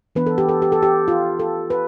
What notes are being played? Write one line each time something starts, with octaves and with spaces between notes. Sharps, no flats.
E3 B3 D4 B4
A4
G4
A4
G4
A4
G4
F4
A4
B4